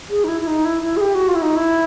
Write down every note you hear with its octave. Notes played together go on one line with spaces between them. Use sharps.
G#4
D#4
E4
E4
D#4
E4
E4
G#4
G4
F#4
F4
E4
D#4
E4